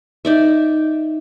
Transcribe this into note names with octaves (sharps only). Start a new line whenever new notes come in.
D#4 D5 E5